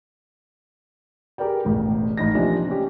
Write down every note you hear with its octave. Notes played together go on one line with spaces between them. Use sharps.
G4 G#4 A#4 B4 D5 G5
E1 A1
A1 D#4 A#6
C3 F3 A#3 D4 G#5
C#4 D4 G4